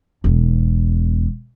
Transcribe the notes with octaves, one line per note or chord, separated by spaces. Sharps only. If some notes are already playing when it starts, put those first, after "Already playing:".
E1 E2